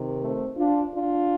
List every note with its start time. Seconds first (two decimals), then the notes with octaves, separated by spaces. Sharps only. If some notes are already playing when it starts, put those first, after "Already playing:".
Already playing: C3 D#3
0.22 A3 C4
0.57 D4 F4
0.92 D4 F4